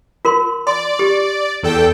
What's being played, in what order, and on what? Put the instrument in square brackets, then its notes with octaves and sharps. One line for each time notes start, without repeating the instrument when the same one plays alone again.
[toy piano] F4 A#4 C6
[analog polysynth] D5 [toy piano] C6
[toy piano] G4
[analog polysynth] E2 A4 G5